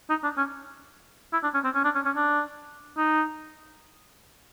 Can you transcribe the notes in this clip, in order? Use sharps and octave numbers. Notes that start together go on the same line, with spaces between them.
D#4
D4
C#4
E4
D4
C#4
C4
C#4
D4
C#4
C#4
D4
D#4